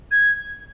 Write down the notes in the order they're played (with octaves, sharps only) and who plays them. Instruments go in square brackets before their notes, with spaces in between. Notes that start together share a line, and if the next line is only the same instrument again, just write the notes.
[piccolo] G#6